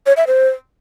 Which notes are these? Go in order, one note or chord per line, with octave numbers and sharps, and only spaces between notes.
C#5
E5
C5